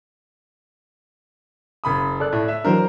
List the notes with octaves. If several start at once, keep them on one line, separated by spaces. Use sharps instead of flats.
F#1 B5 D#6
A4 D5 F#6
A2
E5
E3 F#3 D4 A#4 C5